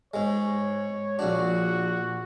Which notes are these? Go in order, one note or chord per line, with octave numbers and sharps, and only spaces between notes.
G#2 G#3 C#5
A#1 D4 F#4